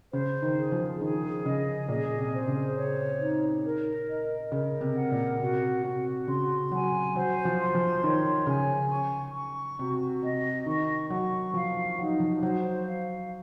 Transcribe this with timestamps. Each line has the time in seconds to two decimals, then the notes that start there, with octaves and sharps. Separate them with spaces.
0.13 C#3 C5
0.42 D#3
0.58 G#4
0.72 F3
1.01 D#3 G#4
1.45 C#3 D#5
1.89 A#2 G#4
2.18 C3
2.33 C5
2.48 C#3
2.77 C#5
3.21 D#4
3.65 A#4
4.09 D#5
4.52 C#3 A#4
4.81 C3
4.96 F#5
5.11 A#2
5.39 C3 F#4
5.84 C3 F#4
6.27 C#3 C6
6.71 F#3 G#5
7.15 F#3 C5
7.45 F3
7.59 C6
7.75 F3
8.04 D#3 C#5
8.47 C#3 G#5
8.92 C#6
9.35 C#6
9.79 C3 F#4
10.22 C3 D#5
10.66 D#3 C#6
11.10 F#3 C#6
11.54 F3 F5
11.98 F#3 D#4
12.20 F3
12.42 F#3 C5
12.86 F5